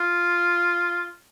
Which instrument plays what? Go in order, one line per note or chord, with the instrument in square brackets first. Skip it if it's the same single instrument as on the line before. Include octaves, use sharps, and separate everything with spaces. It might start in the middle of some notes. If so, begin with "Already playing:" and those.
Already playing: [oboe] F4